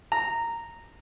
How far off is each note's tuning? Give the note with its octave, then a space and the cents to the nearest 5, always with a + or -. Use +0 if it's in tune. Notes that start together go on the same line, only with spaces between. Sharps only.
A#5 -10